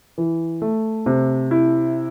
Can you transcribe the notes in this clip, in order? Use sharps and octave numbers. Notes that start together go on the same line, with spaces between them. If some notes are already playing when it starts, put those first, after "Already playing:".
E3
A3
C3
E4